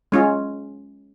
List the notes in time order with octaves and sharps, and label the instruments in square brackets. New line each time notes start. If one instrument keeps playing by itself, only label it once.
[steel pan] G#3 C#4 F4